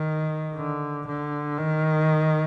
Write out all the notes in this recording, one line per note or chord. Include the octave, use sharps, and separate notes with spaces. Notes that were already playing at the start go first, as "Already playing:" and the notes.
Already playing: D#3
D3
D3
D#3